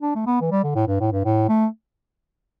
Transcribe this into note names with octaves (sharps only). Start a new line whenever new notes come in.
D4
A3
B3
E3
G3
D3
A2
G2
A2
G2
A2
A3